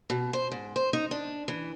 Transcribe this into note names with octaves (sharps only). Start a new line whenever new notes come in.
B2
C5
G#2
C5
D#4
D4
E3